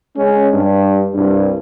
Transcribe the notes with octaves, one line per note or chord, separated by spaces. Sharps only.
G#3 C#4
G2
C2 G2